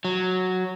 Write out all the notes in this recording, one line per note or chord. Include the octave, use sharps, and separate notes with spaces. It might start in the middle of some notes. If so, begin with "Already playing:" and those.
F#3